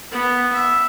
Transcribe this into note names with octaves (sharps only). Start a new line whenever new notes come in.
B3
E5